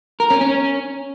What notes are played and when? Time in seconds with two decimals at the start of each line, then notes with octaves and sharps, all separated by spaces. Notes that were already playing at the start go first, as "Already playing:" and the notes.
0.20 A#4
0.30 C#4
0.41 C#4